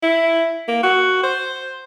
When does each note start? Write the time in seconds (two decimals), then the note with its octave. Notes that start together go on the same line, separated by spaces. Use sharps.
0.03 E4
0.68 A#3
0.83 F#4
1.23 C5